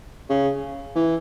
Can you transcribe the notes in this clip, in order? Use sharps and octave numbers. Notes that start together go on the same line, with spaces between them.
C#3
E3